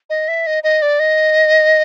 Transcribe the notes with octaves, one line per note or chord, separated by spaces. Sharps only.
D#5
E5
D#5
D#5
D5
D#5